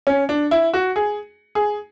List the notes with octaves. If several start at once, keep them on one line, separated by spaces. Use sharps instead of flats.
C#4
D4
E4
F#4
G#4
G#4